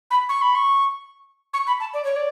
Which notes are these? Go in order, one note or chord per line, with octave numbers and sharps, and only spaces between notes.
B5
C#6
B5
C#6
C#6
B5
A5
D5
C#5
D5